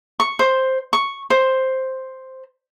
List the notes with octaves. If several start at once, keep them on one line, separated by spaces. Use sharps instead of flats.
C#6
C5
C#6
C5